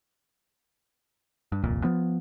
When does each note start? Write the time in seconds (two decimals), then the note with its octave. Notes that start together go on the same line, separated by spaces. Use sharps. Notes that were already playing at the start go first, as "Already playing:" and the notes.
1.52 G2
1.64 D#1 C2 F2 A#2
1.84 F3 B3